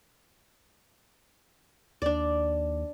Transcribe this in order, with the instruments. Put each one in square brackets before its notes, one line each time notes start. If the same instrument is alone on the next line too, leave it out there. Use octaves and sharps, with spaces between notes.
[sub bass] D#2 [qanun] D4 D5